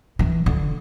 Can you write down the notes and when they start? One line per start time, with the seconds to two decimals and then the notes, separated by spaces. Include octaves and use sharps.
0.19 E3
0.46 D3